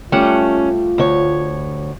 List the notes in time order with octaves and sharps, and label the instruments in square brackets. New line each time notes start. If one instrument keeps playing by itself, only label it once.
[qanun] G3 A3 F#5 [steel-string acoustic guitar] C#4 [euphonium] F4
[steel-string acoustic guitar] D2 C#5